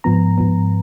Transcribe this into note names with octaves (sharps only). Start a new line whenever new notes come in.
G#2 F3 B3 A#5
G#2 F3 B3